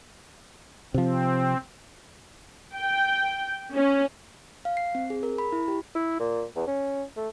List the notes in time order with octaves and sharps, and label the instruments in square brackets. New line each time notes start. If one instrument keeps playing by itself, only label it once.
[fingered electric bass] C3 F3 [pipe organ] C4
[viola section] G5
C#4
[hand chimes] F5
C7
C4
G#4
A#4
B5
E4
G4
[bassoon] E4
A#2
E2
C#4
A3